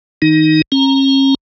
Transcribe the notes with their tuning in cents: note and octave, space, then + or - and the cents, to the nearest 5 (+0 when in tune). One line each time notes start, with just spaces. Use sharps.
D#3 +30 D#4 +0
C#4 -45 A#5 +0